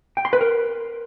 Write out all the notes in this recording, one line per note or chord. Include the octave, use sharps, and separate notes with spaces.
G5
C6
B4
A#4